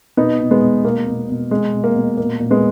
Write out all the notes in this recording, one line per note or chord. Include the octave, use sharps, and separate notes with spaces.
B2 B3 D#4
B2
G#3 B3
B2
B2 A#3
B2
B2
B2 G#3
B2
A#3
B2
A#2 A#3
A#2
G#3 B3